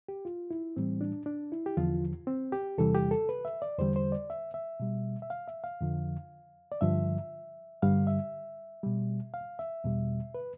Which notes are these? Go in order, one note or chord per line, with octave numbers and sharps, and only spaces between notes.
G4
F4
E4
A2 E3 G3 C4
D4
D4
E4
G4
E2 D3 F3 F4
C4
G4
E2 C3 E3 G3 A4
G4
A4
B4
E5
D5
E2 D3 G3 C5
C5
D5
E5
E5
B2 G3
E5
F5
E5
F5
F2 D3 F3
D5
G2 D3 F3 E5
G2 D3 G3 F5
E5
B2 G3
F5
E5
E2 B2 G3
B4